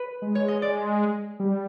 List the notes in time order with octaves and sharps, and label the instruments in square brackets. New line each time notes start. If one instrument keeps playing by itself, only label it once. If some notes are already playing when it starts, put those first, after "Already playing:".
Already playing: [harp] B4
[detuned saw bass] G#3
[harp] C#5
D#5
D5
[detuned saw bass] G3